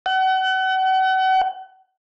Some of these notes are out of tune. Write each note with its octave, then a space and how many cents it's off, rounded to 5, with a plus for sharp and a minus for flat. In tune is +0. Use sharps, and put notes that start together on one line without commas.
F#5 +35